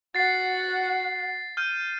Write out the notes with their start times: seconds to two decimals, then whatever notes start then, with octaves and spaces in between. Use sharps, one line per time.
0.15 F#4 F#5 A6 C7
1.57 F6 G6 D#7